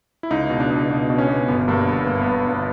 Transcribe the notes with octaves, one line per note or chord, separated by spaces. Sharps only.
E4
C#2 D#4
B2
D4
C#2
B2
B2
C#4
B2
G1 B3
G2 A#3
G1 B3
G1 A#3
B3
G1
G1 B3